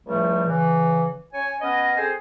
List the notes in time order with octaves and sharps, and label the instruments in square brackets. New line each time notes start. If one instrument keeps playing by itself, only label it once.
[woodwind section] C#2 A2 F3 G3 A3
C#3 E3
C#4 C#5 G#5
B3 C#4 D#5
C4 G#4 A4 C5 G#5